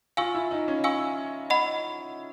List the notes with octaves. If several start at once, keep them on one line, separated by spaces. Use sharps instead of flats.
F4 F5 G#5 C#6 E6
E4
D#4
C#4
F5 G#5 C#6 E6
D#5 F#5 B5